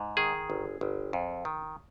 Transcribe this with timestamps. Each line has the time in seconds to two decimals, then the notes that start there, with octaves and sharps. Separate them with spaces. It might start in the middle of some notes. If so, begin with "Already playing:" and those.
Already playing: G#2
0.17 D#3 G#4
0.50 G1
0.81 G1
1.13 F2
1.45 D#3